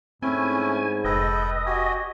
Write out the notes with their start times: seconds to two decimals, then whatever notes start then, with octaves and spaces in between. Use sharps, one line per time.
0.22 G#2 A3 C4 C#4 E4 G#5
1.05 F1 A4 B4 D#5 G5
1.66 F#4 G4 G#5